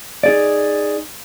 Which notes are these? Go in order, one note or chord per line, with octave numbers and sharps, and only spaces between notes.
D#4 G#4 D5